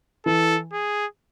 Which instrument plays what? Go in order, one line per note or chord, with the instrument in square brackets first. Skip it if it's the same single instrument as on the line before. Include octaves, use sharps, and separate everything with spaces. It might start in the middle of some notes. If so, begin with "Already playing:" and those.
[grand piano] E3 [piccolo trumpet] A4
[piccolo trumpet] G#4